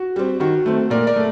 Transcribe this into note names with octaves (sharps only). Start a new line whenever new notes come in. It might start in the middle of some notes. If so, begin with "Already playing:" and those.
Already playing: F#4
G3 C4
D#3 F#4
A3 C4
A#2 A#4 D5
A#4 D5
A3